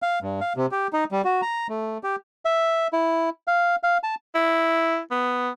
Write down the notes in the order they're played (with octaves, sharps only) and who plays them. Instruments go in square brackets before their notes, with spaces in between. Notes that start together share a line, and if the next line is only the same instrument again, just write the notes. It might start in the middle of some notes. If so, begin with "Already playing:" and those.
[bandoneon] F5
G2
F5
C3
G4
D#4
G3
F#4
A#5
A3
G4
[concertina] E5
E4
F5
F5
A5
[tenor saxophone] E4
B3